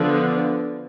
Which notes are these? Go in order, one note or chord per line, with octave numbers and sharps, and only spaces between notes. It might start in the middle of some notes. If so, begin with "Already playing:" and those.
Already playing: D3 F3 B3